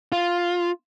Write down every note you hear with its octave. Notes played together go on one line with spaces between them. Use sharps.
F4